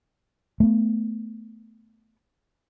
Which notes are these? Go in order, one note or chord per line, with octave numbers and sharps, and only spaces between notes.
A3 B3